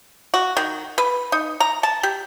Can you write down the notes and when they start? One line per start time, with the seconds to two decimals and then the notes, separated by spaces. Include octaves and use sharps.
0.34 F#4
0.57 D#3
0.98 B4
1.32 D#4
1.60 A#5
1.83 A5
2.03 G4